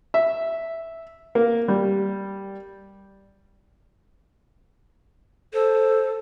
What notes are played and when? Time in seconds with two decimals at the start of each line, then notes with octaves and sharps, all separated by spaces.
0.14 E5
1.35 A#3
1.68 G3
5.54 A4 C5